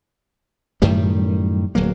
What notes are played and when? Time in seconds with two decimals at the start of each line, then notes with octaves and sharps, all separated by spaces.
0.82 F#2 A2 D#3 G3
1.75 D1 F#3 A#3